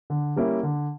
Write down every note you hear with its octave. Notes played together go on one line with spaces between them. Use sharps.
D3
G3 A#3 C#4 E4
D3